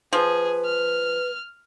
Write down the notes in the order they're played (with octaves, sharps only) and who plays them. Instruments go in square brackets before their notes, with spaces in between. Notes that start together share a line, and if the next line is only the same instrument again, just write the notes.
[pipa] F3 [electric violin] G#4 [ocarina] B4
[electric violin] F6